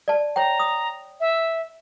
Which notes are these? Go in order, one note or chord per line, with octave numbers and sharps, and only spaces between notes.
D5 A5
C#5 G5 A#5
D#6
E5